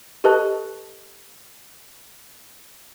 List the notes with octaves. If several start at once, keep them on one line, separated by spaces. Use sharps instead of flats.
G4 A4 B4 D#5 A5 F#6